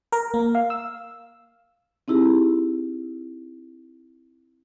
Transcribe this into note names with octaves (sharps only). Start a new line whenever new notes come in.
A#4
A#3
F5
E6
C4 D#4 E4 G4 G#4